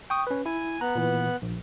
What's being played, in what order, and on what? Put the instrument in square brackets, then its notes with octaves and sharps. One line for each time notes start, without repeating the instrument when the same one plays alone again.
[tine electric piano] G5 C#6 D#6
C#4 B4
[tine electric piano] E4 [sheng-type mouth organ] G#5
[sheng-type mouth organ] B3 F#6 [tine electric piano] A#5
[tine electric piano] A#2 E3
A#1